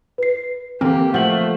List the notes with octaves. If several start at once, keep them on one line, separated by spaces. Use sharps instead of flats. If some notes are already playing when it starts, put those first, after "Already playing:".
B4 C7
D3 E3 A#3 C4 G4
F3 A3 F#5 F#7